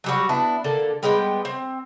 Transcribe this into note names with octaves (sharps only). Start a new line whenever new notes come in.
F#3 G3 F#4
B3 D4 E4 A5
D3 A#3 A4
G3 G#3 B3 G5
C4